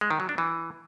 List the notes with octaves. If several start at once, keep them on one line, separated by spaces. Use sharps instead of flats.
G#3
D#3
F#3
D4
E3